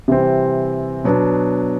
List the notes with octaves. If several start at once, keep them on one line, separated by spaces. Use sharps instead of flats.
C3 E3 G3 C4
B2 F#3 B3 D4